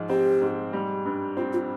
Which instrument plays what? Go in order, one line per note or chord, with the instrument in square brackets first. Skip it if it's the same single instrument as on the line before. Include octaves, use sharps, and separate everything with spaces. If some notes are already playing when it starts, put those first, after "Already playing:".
Already playing: [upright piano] G#2 F3
[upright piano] C4 [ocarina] G4
[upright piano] G#2
G3
G2
[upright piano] C4 [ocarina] F4
[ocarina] F4